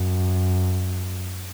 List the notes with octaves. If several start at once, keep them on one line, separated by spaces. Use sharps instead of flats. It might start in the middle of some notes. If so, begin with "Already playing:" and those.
Already playing: F#2